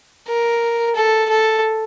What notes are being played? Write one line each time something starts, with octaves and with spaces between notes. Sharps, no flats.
A#4
A4
A4